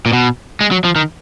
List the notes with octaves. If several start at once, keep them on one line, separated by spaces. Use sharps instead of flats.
A#2
B2
G#3
F#3
F3
D#3